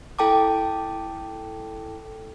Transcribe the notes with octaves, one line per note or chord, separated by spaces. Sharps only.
E4 A4 G5 A5 D6